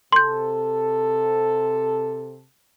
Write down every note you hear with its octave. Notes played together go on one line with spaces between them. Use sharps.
C3 A4 C6 G6